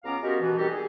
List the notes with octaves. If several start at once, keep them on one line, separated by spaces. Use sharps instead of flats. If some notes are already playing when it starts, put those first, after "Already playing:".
C#2 B3 C#4 F5 A#5 D6
G#3 B3 C#4 F#4 G4 A#4
B2 E3
D#3 G3 C4 F#4 G4 A4
G#4